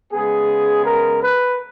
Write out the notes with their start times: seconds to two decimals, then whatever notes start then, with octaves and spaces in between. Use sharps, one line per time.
0.13 C#3 G#3 B3 G#4
0.84 A#4
1.21 B4